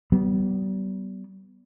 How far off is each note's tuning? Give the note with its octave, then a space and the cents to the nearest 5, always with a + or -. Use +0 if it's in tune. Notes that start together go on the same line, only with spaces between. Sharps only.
G3 -40 B3 +0